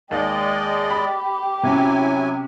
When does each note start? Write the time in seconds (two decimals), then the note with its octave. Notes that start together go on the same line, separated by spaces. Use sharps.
0.11 D#2 G#3 D5 D#5 G5
0.90 G4 B5
1.63 C3 F#3 C#4 E4 G#5